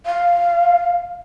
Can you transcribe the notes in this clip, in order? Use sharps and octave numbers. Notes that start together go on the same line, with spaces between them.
F5